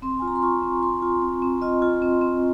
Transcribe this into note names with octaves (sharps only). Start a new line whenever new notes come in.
C4 C6
F4 G#5
A#5
C6
F4 C#6
C4
F4 C6
F4
C4
C4
F4 D#5
F4
C4
C4